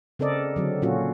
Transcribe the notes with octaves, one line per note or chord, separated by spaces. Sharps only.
C#3 C4 A4 A#4 D5 D#5
D3 F#3 C4
A#2 F#3 C#4 F4 F#4